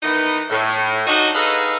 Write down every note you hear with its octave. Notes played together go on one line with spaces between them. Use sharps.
D#3 E3 B3 D#4
A2
D4 D#4 F#4
D#4 G#4 A4 B4 D#5 F5